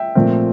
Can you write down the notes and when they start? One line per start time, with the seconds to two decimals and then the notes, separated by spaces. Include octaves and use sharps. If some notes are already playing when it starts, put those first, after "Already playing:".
Already playing: E5 G5
0.15 A#2 F3 A3 C4